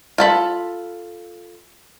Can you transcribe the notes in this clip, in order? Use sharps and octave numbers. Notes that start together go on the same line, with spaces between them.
F4 A4 B5